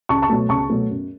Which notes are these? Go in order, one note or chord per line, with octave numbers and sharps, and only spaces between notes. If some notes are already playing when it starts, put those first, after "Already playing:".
C#2 A5 C#6
A5 C#6
B2 F#3 A3
C#2 A5 C#6
B2 F#3 A3
F#2